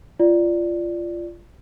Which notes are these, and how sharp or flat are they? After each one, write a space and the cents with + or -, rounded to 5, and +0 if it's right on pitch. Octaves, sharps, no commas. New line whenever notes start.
F4 -20 D5 +0